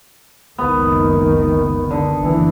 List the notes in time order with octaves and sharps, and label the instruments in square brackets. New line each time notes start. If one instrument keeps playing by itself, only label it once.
[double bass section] F#1 C#2 D#3 [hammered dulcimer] B3
[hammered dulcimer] D3
[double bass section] F#1 E3